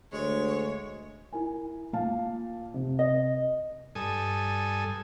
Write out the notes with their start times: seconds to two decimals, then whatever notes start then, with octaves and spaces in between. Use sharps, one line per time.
0.13 D2 G#3 C#5
1.33 E4 A#4 G#5
1.93 A#2 F5 A5
2.74 C3
2.99 D#5
3.95 G2 A4 G#5 D#6